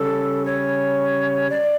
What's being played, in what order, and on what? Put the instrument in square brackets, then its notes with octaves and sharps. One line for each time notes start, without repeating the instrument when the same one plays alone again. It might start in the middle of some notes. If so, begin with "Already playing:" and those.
Already playing: [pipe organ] C#3 G3 C#4 [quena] A4
[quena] C#5
D5